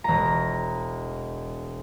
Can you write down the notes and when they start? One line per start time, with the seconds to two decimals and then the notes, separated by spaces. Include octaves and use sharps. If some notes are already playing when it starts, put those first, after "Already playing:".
0.04 E1 A#5